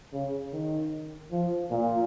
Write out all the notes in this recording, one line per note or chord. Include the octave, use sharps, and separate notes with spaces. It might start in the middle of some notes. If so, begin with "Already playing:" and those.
C#3
D#3
F3
A#2